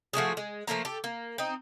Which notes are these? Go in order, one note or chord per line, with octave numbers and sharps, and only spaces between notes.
F3 A3 F#4 G#4
G#3
F3 A3 A#3 A#5
G4 A4
A#3
C4 D#4